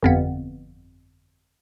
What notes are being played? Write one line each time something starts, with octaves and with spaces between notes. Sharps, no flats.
G1 F2 B3